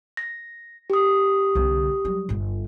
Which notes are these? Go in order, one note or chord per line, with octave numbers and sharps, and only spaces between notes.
A#6
G4 D#6
C2 D3
F#3 G3
G1 G2